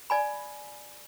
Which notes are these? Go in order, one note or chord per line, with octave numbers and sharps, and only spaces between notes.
D5 G#5 B5